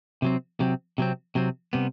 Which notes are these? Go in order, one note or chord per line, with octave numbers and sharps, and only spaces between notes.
C3 F#3 C4
C3 F#3 C4
C3 F#3 C4
C3 F#3 C4
C3 G3 B3